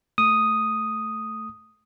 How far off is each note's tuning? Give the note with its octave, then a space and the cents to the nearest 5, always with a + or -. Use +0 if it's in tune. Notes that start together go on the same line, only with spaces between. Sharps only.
A3 +0 D#6 +0